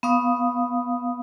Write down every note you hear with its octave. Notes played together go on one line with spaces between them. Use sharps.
B3 F5 D#6